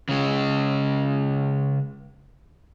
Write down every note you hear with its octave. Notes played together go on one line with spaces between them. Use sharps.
C#3 G#3